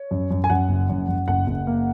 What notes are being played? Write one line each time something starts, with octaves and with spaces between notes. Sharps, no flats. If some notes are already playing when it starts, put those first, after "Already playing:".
Already playing: C#5
F#2
F#2
G#5
F#2 F#5
F#1
F#2
F#2
F#1 F#5
F#1
A#3